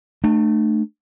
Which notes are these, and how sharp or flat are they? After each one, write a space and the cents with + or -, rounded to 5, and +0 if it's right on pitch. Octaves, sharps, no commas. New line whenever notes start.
A3 +0 D4 +40